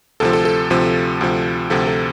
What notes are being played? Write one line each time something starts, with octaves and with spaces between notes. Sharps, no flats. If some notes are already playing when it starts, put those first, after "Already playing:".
D2 C3 F3 A4
A4
A4
D2 C3 F3
D2 C3 F3
D2 C3 F3 A4
A4